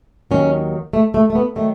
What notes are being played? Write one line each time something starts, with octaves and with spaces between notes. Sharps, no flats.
D#2 D#3 F#3 C#4
A3
A3
A3
B3
D#3 F#3 A3